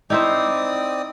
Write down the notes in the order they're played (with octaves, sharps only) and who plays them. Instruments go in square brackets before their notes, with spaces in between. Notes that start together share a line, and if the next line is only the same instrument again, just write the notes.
[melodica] C4 D5 D#6 [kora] D#4 E4 C5